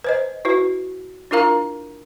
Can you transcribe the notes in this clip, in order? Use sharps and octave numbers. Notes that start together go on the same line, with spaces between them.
B4 C5 D#5
E4 F#4 B4
D4 E4 F4 A#4 F5 A#5